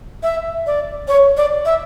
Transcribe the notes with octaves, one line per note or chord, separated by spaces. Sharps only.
E5
D5
C#5
D5
E5